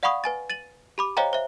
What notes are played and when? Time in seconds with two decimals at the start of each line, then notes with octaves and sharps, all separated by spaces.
0.03 D5 F5 F#5 B5 C#6 D#6
0.24 B4 G#5 A6
0.50 A6 D#7 F#7
0.98 G4 B5 D6
1.17 C5 C#5 D#5 F5 G5 A#5
1.33 C5 E5